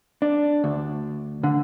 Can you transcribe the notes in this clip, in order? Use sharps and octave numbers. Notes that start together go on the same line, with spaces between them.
D4
D2
D3